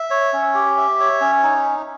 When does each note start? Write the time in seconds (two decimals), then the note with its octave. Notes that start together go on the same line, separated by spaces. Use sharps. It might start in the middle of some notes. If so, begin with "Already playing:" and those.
Already playing: E5
0.11 C#5
0.33 C#4
0.54 G4
0.77 E5
1.00 C#5
1.21 C#4
1.43 D#4